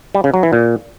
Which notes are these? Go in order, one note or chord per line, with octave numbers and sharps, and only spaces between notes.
G3
C#3
F#3
E3
A#2